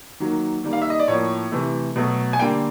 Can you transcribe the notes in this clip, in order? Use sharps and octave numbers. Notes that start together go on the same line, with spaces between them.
D#3 F#3 A#3
D#3 G3 A#3
F5
E5
D#5
D5
A2 F3 A#3 C#5
C3 E3 A3
B2 F#3 A3
G#5
D3 G3 A#3 G5